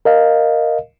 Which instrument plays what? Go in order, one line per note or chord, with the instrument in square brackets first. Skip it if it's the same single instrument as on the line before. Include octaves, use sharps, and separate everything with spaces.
[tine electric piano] A#4 D#5 F5